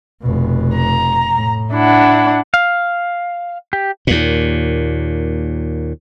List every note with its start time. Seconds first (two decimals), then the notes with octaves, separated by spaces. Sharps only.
0.21 F1 B2
0.74 A#5
1.33 A2
1.74 D4 E4 F#5
2.54 F5
3.73 G4
4.07 D#2 A#2